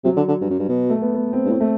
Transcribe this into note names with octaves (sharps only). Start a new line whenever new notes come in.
C3 F#3
D3
D3
G2
F#2
G2
B2
A3
B3
B3
C4
G2
A2 C4
A3